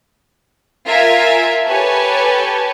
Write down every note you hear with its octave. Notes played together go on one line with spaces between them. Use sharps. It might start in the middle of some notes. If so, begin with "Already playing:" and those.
F4 A#4 E5 G#5 G#6
G4 A4 B4 C#5 G#5 A5